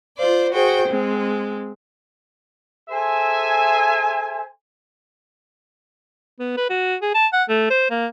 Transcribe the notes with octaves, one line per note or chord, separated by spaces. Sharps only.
F4 C5 D5
F#4 G#4 C5 G5
G#3 C4
G#4 A4 C5 E5 G#5
B3
B4
F#4
G#4
A5
F#5
A3
C5
A#3